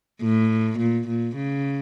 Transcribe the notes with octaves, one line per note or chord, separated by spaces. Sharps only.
A2
A#2
A#2
C#3